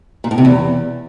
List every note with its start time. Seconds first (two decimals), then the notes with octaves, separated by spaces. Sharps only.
0.24 A#2
0.31 A2
0.38 C3
0.45 E2